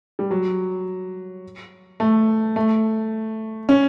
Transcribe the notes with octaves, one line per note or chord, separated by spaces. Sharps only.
G3
F#3
A3
A3
C#4